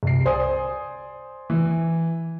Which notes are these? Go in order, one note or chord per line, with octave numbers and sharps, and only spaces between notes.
C2 C7
C5 D5 G#5 D#6
E3